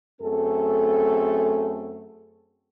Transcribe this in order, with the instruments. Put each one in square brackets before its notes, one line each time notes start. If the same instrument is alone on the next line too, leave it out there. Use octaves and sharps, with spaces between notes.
[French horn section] F#2 A3 C4 G#4 A4